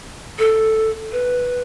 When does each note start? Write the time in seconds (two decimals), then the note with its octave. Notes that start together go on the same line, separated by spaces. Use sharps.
0.39 A4
1.12 B4